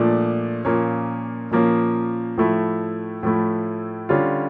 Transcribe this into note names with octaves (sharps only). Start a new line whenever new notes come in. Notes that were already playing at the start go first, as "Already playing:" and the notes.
Already playing: A#2 F3 A3 D4
A#2 F3 A#3 C#4
A#2 F3 A#3 C#4
A2 F3 A3 E4
A2 F3 A3 E4
D3 G3 C#4 F4